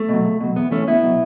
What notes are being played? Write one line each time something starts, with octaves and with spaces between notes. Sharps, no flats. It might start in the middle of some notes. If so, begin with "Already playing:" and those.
Already playing: A3
B2 F#3
C#2
B2 F#3
E2 B3
E3 A3 C#4
C#2 B3 E4
B2 F#3